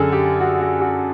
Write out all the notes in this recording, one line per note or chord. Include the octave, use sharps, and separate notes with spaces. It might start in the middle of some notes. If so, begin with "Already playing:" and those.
Already playing: F#2 D3 G#4 A4
G4
F#4
F#4
F#4